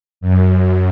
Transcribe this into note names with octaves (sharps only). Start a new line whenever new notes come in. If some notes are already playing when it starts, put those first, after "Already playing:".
F#2